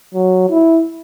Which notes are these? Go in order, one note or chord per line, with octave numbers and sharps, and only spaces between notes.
F#3
E4